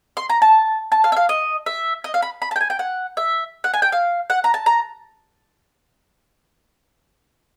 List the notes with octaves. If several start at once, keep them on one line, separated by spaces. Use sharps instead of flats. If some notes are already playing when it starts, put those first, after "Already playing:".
C6
A#5
A5
A5
F5
E5
F5
D#5
E5
D#5
F5
B5
B5
A5
G5
G#5
G5
F#5
E5
F#5
G#5
G5
F5
F#5
A#5
A5
A#5